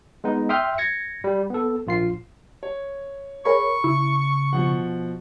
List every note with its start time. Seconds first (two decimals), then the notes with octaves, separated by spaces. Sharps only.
0.24 G#3 B3 D#4
0.49 E5 G5 C6 D#6 F6 G6
0.78 G#6 A#6 C#7
1.24 G3
1.50 B3 A4
1.87 A#1 F4 C7
2.63 C#5
3.45 G#4 A#4 C#5 B5 C#6
3.84 C#3 E4
4.53 A#1 G2 B2 F3 F#5